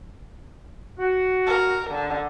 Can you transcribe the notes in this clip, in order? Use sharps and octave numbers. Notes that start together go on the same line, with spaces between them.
F#4
A#4
D3